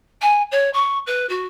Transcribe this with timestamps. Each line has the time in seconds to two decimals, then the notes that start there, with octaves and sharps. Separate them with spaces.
0.21 G#5
0.51 C#5
0.73 C#6
1.06 B4
1.29 F#4